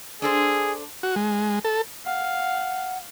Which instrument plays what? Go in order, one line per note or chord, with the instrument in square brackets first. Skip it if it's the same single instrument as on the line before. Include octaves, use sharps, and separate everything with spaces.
[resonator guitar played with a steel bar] D4 A4 C5 [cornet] G#4
[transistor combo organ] F#4
G#3
A4
[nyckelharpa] F5 [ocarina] F#5